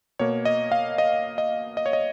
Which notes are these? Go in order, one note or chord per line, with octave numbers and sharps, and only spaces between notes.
B2 A#3 C#5
D#5
F5
D#5
D#5
D#5
C#5
D#5